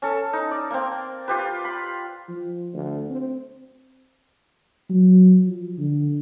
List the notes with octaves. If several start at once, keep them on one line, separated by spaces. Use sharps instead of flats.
C#4 A4
D#4
D5
A#3 C4
F4 G4 B4
B5
F3
D2
C4
F#3
F3
D3